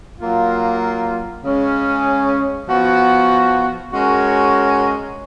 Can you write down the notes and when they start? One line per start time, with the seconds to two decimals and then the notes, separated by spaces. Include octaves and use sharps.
0.20 F#3 A#3 F4
1.43 C#3 G#3 C#4
2.68 F3 B3 F#4
3.92 G#3 C#4 F#4 A#4 C#5